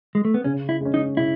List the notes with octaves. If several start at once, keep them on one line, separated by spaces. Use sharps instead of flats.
G#3
A3
B3
C#3 C#4
E4
G#3 C#4
D#4
C#3 E4